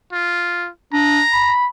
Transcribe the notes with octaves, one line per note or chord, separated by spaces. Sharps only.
F4
D4 A#5
B5